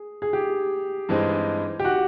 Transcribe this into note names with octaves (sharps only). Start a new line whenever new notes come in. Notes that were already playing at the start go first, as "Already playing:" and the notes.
Already playing: G#4
G#4
G4
G2 E3 G#3 C4 D#4
G4
F#4